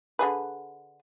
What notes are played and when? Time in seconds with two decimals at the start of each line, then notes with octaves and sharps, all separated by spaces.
0.19 D3 G#4 B4